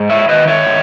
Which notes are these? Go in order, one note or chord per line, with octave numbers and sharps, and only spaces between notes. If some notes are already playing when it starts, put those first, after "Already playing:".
Already playing: G#2
C#5 E5
D#3 B4 D#5
C#5 E5
D#3